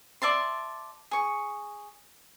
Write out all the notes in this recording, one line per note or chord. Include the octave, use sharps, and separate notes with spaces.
D5 E5 A5 C6
G#4 C#6